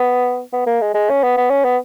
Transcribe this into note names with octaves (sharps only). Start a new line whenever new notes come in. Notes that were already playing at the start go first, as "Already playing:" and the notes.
Already playing: B3
B3
A#3
G#3
G#3
C#4
B3
B3
C#4
B3